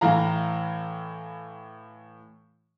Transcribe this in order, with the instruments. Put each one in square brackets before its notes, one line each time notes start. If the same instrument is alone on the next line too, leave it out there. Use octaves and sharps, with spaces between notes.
[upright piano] A2 E3 F5 A#5